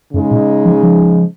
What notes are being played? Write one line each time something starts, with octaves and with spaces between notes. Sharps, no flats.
F#2 C#3 G#3 D#4
A#2
F3
F3